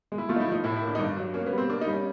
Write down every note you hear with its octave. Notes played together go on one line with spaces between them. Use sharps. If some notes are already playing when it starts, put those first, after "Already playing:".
G#3
E4
A3 F4
D#4
E4
F3 D#4
A2 E4
E4
A#3
D4
D#4
G2 D4
F#3
A#3 C#4
B3
G3
C4
A#3 D4
D#4
G3
C#4